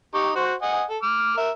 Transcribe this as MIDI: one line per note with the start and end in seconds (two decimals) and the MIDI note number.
0.14 0.31 63
0.14 0.31 67
0.14 0.31 85
0.36 0.54 66
0.36 0.54 72
0.62 0.84 75
0.62 0.84 78
0.62 0.84 80
0.89 0.97 69
1.03 1.37 86
1.03 1.37 89
1.37 1.51 70
1.37 1.51 76